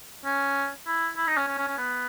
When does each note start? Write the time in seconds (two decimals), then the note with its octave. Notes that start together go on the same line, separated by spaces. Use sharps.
0.25 C#4
0.87 E4
1.17 E4
1.27 D#4
1.37 C#4
1.48 C#4
1.58 C#4
1.68 C#4
1.78 B3